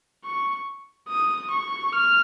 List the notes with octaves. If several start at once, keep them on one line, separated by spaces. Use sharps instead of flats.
C#6
D#6
C#6
F6